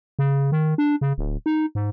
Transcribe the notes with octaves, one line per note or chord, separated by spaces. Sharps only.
C#3
D#3
D4
C#3
D1
D#4
G#2